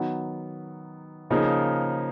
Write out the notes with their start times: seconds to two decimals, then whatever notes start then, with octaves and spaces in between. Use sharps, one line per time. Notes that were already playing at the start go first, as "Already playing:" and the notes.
Already playing: D#3 F#3 B3
1.30 C#3 F3 A#3 D#4 G#4